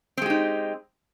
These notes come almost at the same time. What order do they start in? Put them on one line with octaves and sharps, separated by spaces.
C4 G#3 G4 D#4